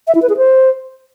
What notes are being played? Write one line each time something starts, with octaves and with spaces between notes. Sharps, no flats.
E5
E4
B4
G#4
C5